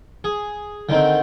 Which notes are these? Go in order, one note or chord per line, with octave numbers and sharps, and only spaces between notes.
G#4
D3 D#3 C4